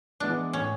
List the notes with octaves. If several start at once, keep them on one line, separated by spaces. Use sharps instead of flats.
E3 G#3 B3 D4 E4
A2 C#4